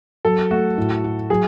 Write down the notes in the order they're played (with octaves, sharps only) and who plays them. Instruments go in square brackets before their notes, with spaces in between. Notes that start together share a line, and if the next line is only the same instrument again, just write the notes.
[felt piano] F#3 [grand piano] A4
[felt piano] A3 [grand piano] F#4
[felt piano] A2
F#4
[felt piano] F#3 [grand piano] G#4